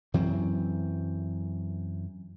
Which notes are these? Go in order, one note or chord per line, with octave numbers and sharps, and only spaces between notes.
F#2 E3 F#3 C4